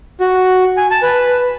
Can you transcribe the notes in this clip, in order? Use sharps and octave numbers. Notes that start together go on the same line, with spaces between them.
F#4
G#5
A5
B4